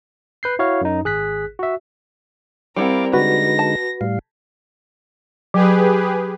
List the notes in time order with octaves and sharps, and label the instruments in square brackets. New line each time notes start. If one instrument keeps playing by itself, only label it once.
[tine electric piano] B4 G6 C7
E4 F#4 C#5 F5
F#2 D#4
G#1 G#4 F#6 B6
F#4 E5
[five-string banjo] G3 E4 F#5 [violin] C4 A#4 [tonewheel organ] D5 F5 D6
[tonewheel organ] D3 G#3 D#4 [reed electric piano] F#4 B4 [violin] A#6
[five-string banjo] A5
[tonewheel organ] A2 G3 F5
[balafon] F#3 [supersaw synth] G4 G#4 B4